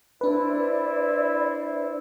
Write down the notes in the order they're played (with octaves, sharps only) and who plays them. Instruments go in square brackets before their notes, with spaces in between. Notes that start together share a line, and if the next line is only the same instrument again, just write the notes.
[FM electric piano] D4 B4 [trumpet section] E4 C5 [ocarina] D5